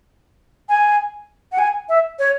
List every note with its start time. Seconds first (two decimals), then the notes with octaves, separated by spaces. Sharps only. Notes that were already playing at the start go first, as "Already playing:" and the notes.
0.69 G#5
1.52 F#5
1.58 G#5
1.89 E5
2.19 C#5